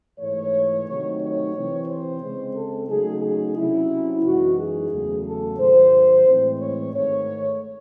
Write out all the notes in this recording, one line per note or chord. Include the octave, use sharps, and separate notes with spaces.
G#2 E3 A3 C#5
C3 D#3 F#3 A3 D#4
C#5
C3 E3 C4
C5
C#3 G#3 C4
A4
C#3 F#3 A3 D#4 G#4
G#4
C3 F#3 C#4 E4
F#2 E3 G#3 D#4 F#4
G#4
E2 C#3 F#3 A3
A4
G#2 D#3 F#3 C5
A2 E3 G#3 C4
C#5
G#2 D#3 A3 C#5